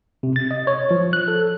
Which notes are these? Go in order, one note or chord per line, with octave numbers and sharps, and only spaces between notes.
C3
A6
D#5
C#5
F3
F#6
A4